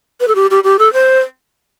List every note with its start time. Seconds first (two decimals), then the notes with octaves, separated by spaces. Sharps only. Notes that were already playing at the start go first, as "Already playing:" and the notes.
0.20 B4
0.28 A4
0.35 G4
0.51 G4
0.64 G4
0.79 A4
0.93 C5